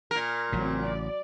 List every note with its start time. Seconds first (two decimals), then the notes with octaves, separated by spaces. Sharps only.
0.11 A#2 A#4
0.52 A1 C#3 F#3 C4
0.85 D5